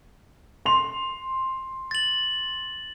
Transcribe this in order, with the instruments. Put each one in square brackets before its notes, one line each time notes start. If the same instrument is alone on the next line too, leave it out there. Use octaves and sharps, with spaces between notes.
[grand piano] C6 F7
[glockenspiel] A6 F#7